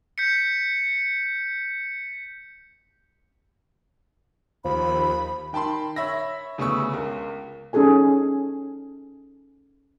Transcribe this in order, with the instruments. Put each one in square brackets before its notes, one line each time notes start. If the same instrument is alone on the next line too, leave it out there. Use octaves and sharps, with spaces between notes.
[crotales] G6 B6 C#7
[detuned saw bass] D#2 [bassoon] F3 [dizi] B5
[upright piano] D#3 G5 A5 B5 C6
C#5 E5 B5 A#6
D2 C#3 B3 C#6 E6
C#2 A#4
[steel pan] C#4 D#4 G#4 A4 G#5